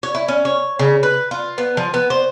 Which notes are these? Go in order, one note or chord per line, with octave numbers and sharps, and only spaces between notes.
C#5
E4
C#4
C#5
C#3
B4
F4
B3
F3
B3
C5